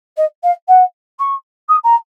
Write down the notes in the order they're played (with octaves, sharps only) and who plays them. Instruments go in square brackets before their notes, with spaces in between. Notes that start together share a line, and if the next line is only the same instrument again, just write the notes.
[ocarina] D#5
F5
F#5
C#6
D#6
A#5